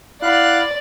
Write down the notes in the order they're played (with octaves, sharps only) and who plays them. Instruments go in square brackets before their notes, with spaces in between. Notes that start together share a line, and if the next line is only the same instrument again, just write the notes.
[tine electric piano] E4 F#5 B5 [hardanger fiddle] D5 [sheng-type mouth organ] F5 F#6